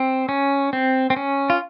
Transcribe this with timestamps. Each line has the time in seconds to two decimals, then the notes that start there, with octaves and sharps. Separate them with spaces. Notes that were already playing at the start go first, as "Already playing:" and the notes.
Already playing: C4
0.29 C#4
0.73 C4
1.10 C4
1.16 C#4
1.50 F4